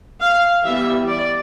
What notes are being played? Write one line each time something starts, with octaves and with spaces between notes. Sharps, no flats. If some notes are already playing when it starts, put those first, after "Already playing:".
F5
E3 G3 B3 E5
D5